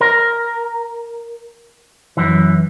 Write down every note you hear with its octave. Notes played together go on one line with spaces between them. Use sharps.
A#4
F#2 E3